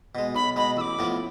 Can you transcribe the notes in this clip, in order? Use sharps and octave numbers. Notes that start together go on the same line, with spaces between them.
B2 G#3
B1 B5
B2 G#3 B5
A1 D6 E6
A2 F3 B3